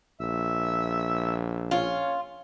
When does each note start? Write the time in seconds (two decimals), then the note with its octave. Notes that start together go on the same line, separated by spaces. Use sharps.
0.20 A#1 E5
1.71 C#4 F4